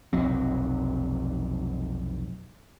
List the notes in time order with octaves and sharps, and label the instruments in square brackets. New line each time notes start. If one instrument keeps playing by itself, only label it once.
[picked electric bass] F1 B1 F#3 C4